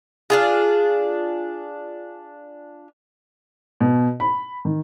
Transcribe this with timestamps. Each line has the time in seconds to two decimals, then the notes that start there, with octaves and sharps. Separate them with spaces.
0.30 D4 F4 G#4
3.80 B2
4.20 B5
4.65 D#3